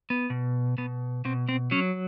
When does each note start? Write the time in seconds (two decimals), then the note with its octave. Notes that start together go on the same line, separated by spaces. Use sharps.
0.10 B3
0.30 B2
0.78 B2 B3
1.25 B2 C4
1.49 C4
1.71 F#3 C#4